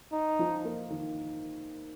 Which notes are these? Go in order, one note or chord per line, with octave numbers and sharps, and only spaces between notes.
D#4
F3
A#3
D#3